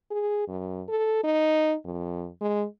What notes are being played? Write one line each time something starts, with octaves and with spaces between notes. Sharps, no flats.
G#4
F#2
A4
D#4
F2
G#3